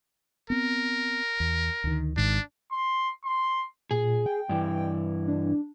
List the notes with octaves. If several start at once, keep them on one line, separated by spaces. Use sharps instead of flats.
B3 C4 A#4
E2
D2 D#3
G#1 G#2 D#3 D4
C6
C6
A#2 G#4
G5
G2 E3
D4